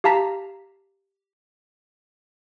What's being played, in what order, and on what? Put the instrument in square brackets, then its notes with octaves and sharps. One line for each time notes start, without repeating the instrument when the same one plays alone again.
[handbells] G4 F5 A5 A#5 B6